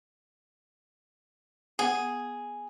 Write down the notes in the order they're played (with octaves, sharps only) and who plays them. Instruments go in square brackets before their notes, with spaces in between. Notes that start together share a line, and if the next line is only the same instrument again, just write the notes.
[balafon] B3 F#5 [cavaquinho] G#4